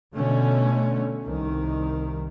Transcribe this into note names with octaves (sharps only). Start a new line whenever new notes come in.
B2 D3 A3 C#4
C2 D#3